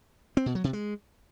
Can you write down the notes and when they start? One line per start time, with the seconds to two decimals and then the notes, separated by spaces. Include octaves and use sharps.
0.37 C4
0.46 B2
0.55 F#3
0.64 C3
0.73 G#3